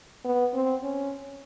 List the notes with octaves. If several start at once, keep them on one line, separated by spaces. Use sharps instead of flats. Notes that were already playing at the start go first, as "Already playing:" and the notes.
B3
C4
C#4